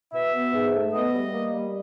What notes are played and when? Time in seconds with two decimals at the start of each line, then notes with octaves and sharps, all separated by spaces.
0.13 B2 E5
0.33 B3
0.53 G#2
0.73 A3
0.92 B3 D#5
1.12 G3
1.32 A#3
1.51 G3